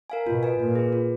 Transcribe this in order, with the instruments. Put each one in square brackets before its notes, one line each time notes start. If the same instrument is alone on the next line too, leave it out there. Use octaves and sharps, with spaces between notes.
[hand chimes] A#4 F5 G#5
[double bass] B2 [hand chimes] F4
[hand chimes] B4 D#5 G#5
[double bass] A#2 [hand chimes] F4
[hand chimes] G#4 B4
F4